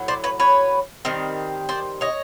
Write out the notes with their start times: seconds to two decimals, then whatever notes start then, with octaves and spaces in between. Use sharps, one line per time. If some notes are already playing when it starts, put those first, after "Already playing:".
Already playing: A2 F#3
0.08 C5 D5
0.24 B4 C#5
0.40 B4 C#5
1.05 D#3 G3 C4
1.69 C5 D5
2.01 C#5 D#5